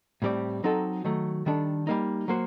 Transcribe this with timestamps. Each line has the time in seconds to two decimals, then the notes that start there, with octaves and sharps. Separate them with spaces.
0.22 A2 G3 C4 G4 D5
0.64 F#3 C4 D#4 F#4 A4
1.04 D#3 F#3 A3
1.46 D#3 G3 D4 A4
1.87 G3 A#3 D#4
2.28 F#3 A#3 F#4 C5